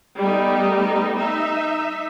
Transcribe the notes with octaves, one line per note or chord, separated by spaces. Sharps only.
G3 A3 B3 D#4
D#4 E5